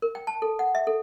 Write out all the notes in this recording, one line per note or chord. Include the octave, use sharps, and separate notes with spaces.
A#4
G5
A5
A4
F#5
E5
A4